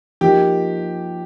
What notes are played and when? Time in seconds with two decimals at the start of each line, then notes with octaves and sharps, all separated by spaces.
0.21 F3 A#3 D#4 G4